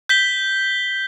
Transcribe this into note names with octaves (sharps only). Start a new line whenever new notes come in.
G6 B6 G7